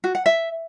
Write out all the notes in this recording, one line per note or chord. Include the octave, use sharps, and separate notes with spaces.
F#4
F#5
E5